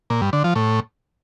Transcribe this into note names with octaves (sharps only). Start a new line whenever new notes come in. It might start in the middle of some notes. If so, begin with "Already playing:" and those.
A#2
G2
D3
F3
A2